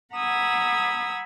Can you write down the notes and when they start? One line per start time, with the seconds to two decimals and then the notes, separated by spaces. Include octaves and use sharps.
0.13 F#5 A#5 B5 D#6 E6 G#6